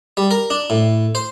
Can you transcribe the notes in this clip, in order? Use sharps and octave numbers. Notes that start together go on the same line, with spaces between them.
G3
A#4
D4
A2
C5